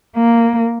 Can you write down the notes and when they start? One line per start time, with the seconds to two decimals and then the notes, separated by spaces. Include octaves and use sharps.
0.16 A#3